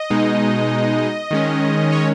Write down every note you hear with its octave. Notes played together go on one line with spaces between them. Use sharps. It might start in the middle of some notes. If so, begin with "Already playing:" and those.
Already playing: D#5
B2 G#3 D#4
D#3 G#3 C#4
C#5